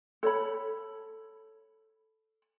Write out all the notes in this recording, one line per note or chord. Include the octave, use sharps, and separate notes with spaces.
A4 C#5 B5